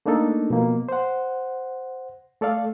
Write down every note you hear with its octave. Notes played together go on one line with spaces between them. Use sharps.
A3 A#3 D4 D#4 A4
B2 F3 A#3
C5 F#5
A3 A4 D5 F5